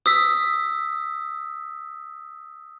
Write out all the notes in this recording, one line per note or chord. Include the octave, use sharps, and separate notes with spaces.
D#6 E6 B6